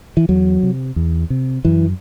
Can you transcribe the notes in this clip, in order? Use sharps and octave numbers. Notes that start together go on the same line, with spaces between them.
E3
E2 F#3
C3
E2
C3
F#2 E3